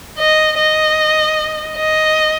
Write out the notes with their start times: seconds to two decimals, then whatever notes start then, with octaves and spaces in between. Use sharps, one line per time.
0.18 D#5
0.57 D#5
1.76 D#5